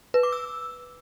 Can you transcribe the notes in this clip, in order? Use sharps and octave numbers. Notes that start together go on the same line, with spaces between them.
B4
D6
E6